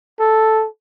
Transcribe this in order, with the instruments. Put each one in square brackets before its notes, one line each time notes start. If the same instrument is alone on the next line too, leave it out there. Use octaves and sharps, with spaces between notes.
[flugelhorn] A4